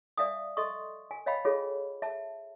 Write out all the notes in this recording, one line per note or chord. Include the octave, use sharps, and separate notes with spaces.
D5 E5 F5 G#5 D#6
A4 D#5 C6 C#6 D#6
G#5
C#5 D#5 F5 G5 B5
F4 G#4 A4 C#5
E5 A5